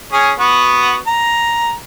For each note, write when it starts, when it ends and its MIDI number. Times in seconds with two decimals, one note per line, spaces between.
0.13 0.32 61
0.13 0.32 68
0.40 0.96 59
0.40 0.96 66
1.07 1.74 82